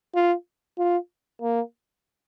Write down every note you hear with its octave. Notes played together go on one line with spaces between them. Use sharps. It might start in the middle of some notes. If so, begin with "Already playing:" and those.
F4
F4
A#3